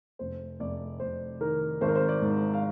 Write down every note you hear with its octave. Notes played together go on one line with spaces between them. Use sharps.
F1 C5
F1 D5
F1 C5
D#3 A#4
G#1 C5
A#4
C5
D5
G#2
F5